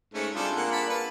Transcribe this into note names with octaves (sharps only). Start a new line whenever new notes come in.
G#2 A3 C#4
C3 G3 D4 F4 G#4 A4
A#3 F#5
A5 B5
B4